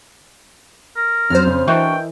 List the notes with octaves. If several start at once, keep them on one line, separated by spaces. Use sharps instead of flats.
A#4
F2 F#3 B3 C#4 C5 F6
C#3 C#4
E3 D4 F#4 A#4 D#5 E5 G5